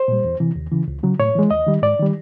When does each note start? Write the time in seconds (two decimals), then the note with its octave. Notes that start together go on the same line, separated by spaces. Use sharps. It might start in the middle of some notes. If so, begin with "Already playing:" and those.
Already playing: C5
0.08 A#2 G3
0.24 E2
0.40 C3 E3
0.56 D#2
0.72 C#3 E3
0.88 C#2
1.03 C#3 F#3
1.19 A2 C#5
1.35 E3 G#3
1.51 D#2 D#5
1.67 D#3 G3
1.82 G#2 D5
1.99 D#3 G3